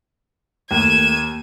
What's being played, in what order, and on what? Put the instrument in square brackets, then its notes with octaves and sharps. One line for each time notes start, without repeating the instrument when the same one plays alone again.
[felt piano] D#2 [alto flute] A3 [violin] G#6 D#7 [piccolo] E7